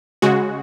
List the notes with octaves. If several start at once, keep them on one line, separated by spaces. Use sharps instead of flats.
C#3 G#3 F#4